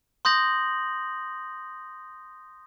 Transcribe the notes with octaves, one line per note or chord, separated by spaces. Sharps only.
C6 D#6 G6 A#6 F#7